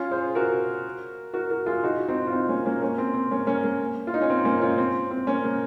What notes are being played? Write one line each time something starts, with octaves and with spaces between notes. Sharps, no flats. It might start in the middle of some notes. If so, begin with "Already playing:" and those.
Already playing: C#4 F4
G#4 C5
F#4 A#4
F#4 A#4
F#4 A#4
F4 G#4
D#4 F#4
C4 D#4
F4
C4 D#4
A#3 C#4
A#3 C#4
A#3 C#4
C4
C4
A#3 C#4
A#3 C#4
A#3
F4
D#4
C#4
C4
A#3 C#4
C#4 F4
C4
C4
A#3 C#4
A#3